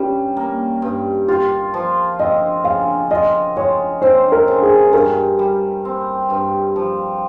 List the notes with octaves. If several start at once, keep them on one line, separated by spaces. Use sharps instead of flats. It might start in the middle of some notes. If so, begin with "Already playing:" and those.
Already playing: G2 G3 C#4
A#3
G2
F4 G4
F3
C4 D#5
C#3 F5
F4 D#5
G#3 C#5
C4 C5
A#4
C#3
G#4
G2 A#4
G3
C4
G2
F3